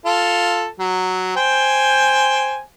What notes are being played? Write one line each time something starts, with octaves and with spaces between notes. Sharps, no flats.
F4 A4
F#3
C5 G5 G#5